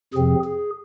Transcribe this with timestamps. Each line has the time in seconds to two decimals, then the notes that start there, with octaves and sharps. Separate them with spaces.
0.14 F2 C3 F3 C4 G#4
0.44 G#4